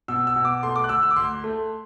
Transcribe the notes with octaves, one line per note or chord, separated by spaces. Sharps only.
B2 E6
E6
B2
D6
A3 C6
D6
F#6
D2 E6
E6
D6
D2 C6
A3